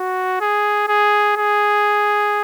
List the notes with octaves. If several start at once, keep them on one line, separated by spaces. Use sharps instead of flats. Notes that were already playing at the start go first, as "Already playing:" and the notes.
Already playing: F#4
G#4
G#4
G#4